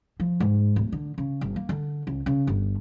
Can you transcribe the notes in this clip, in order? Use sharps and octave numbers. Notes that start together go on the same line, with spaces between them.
F3
G#2
D1
D3
C#3
G1
A#3
D3
C#2
C#3
G1